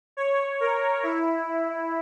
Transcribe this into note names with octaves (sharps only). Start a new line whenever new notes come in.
C#5
A#4
E4